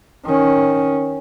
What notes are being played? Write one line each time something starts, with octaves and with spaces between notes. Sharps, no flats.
D#3 C#4